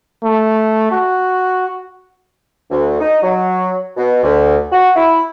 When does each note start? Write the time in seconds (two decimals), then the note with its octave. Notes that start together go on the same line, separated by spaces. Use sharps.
0.23 A3
0.92 F#4
2.70 D2
3.00 D#4
3.22 F#3
3.97 B2
4.23 D2
4.72 F#4
4.95 E4